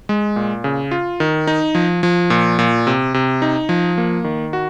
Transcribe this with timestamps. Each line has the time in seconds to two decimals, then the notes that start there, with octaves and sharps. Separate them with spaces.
0.09 G#3
0.36 A#2
0.64 C#3
0.91 F4
1.20 D#3
1.47 D#4
1.75 F3
2.03 F3
2.30 A#2
2.59 A#2
2.87 C3
3.14 C3
3.42 D#4
3.69 F3
3.98 A#3
4.24 D#3
4.53 F#4